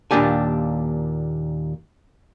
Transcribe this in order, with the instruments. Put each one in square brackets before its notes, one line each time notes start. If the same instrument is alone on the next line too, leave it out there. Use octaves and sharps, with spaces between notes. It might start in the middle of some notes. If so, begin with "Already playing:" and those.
[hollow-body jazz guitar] D#2 A#2 D4 G4 G#5